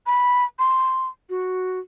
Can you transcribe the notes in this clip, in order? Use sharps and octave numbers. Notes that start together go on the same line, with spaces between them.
B5
C6
F#4